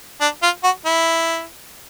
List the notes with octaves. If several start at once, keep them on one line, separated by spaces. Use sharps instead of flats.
D4
F4
F#4
E4